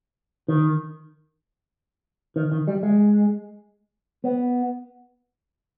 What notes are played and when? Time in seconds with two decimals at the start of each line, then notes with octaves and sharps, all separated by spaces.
0.48 D#3
2.36 D#3
2.52 D#3
2.68 G3
2.83 G#3
4.24 B3